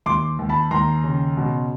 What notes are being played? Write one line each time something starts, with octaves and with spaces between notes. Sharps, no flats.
D#2 C6 D6
D#2
A5 B5
D#2 A#5 C6
C#3
B2